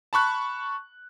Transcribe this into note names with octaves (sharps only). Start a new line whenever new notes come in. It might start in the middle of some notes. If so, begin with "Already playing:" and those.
A5 B5 C#6 F#6